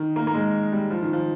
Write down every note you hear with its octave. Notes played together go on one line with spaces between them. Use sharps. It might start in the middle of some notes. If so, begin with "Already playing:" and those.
Already playing: D#3
A#3
A#3
G#3
G3
F3
D#3
F3